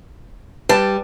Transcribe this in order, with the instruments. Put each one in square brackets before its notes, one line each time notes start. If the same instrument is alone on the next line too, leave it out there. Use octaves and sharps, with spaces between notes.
[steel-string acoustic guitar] G3 [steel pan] B4 A5